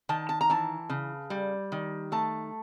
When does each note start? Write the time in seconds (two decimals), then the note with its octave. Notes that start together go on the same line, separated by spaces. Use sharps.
0.09 D#3 A5
0.29 A5
0.41 A#5
0.50 E3 A5
0.89 C#3
1.30 G3
1.72 D#3
2.12 A3 A5